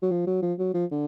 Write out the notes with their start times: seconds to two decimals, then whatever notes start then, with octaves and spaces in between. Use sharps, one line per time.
0.02 F#3
0.11 F3
0.27 F#3
0.42 F3
0.59 F#3
0.74 F3
0.91 D3